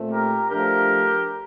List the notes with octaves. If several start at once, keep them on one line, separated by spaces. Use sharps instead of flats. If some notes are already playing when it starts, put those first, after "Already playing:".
Already playing: A#2 A3 C4
G4 A#4
F3 A3 D4 G4 A#4